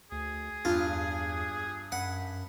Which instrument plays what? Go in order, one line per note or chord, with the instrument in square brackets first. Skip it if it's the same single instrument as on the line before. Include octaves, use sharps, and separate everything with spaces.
[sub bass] D2 [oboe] G#4
[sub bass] E2 [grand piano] G2 [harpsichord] F4
[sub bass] F#2 [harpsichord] F#5 [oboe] B5